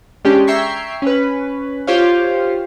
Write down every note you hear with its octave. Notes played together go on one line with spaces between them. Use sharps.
G#3 C#4 D4 G4
E5 G5 A#5 C#6 G#6 C7
C#4 B4
F4 G4 C5 C#5 F5